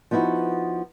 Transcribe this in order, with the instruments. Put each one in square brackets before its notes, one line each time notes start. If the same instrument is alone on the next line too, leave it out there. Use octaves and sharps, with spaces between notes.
[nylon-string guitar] F3 B3 D#4 E4 F#4